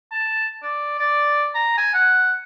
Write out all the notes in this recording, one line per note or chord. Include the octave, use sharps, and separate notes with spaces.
A5
D5
D5
A#5
G#5
F#5